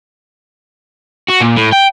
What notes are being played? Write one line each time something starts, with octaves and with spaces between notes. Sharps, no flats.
F#4
A#2
A2
G5